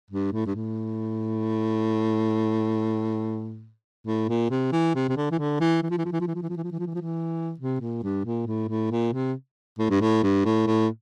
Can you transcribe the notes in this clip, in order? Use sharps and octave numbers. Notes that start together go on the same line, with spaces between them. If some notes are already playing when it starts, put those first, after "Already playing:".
G2
A2
G2
A2
A2
A#2
C3
E3
C3
C3
D3
E3
D3
E3
E3
F3
E3
F3
E3
F3
E3
F3
E3
F3
E3
F3
E3
F3
E3
F3
E3
C3
A#2
G2
A#2
A2
A2
A#2
C3
A2
G2
A2
G2
A2
A2